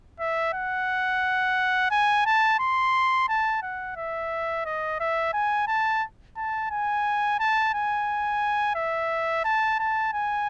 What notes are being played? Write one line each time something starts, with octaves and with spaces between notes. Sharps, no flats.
E5
F#5
G#5
A5
C6
A5
F#5
E5
D#5
E5
G#5
A5
A5
G#5
A5
G#5
E5
A5
A5
G#5